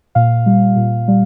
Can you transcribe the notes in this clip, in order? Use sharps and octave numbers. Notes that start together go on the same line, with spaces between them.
A#2 F5
G3
A#2
G3